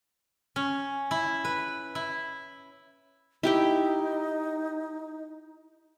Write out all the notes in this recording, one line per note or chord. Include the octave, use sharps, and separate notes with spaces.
C#4
E4
B4
E4
D#4 E4 G4 G5